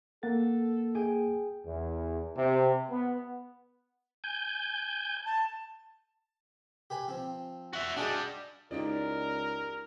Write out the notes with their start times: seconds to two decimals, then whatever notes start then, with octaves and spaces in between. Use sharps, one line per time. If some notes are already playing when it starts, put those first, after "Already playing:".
0.23 A#3 A4 F#5 A6
0.95 G#4 G5 G#5
1.66 E2
2.37 C3
2.90 B3
4.24 G#5 G6
5.25 A5
6.90 G4 B4 G#5
7.08 F3 C4
7.73 F#4 E5
7.97 G3 D4 F#4 G#4 D#5
8.71 C#2 D#4 E4 G4 A#4 D5